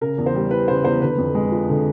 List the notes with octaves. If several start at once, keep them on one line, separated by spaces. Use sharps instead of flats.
C#3 A#4
E2
C5
G3
E3 B4
C#3 C5
E2 C5
D3 B4
F2
G#3
F3
D3